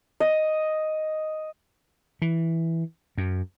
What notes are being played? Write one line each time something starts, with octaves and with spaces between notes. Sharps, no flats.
D#5
E3
F#2